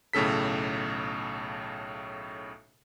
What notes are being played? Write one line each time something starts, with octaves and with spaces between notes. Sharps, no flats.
B1 A2 C#3 A4 B6